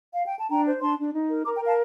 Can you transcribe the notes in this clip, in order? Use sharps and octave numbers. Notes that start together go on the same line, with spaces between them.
F5
G5
A5
D4 G5 A#5
C5
D4 A5 C6
D4
D#4
A#4
A#4 A#5 D6
G5 A#5
A#4
F5 A5